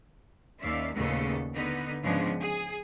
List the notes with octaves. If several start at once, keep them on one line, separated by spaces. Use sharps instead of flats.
D#2 C#4 D5 E5 F5
D#2 A#2 C#3 A3 B3 A4
D3 B3 D#4 B4
G#2 C#3 F3 G#3 B3 D4
G#4